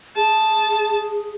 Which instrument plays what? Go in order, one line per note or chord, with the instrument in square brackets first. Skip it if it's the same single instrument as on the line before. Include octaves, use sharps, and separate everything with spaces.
[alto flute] G#4 [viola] A5